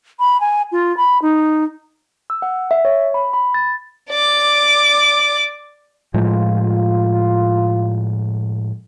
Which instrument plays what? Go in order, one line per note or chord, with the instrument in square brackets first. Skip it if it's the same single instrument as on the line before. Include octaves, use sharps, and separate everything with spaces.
[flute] B5
G#5
F4
B5
D#4
[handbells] E6
F#5
E5
C#5
B5
B5
A6
[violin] D5 D6
[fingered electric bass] A2 F3 G#3 [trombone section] F4